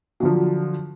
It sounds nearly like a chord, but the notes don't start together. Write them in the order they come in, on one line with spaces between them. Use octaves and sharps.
F#3 D3 F3